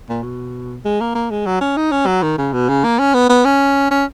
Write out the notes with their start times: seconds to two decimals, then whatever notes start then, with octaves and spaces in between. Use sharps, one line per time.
0.09 A#2
0.23 B2
0.85 G#3
1.00 A#3
1.15 A#3
1.31 G#3
1.46 F#3
1.61 C#4
1.77 D#4
1.92 C#4
2.07 F#3
2.23 D#3
2.38 C#3
2.53 B2
2.69 C#3
2.84 A#3
2.99 C#4
3.14 B3
3.29 B3
3.45 C#4
3.91 C#4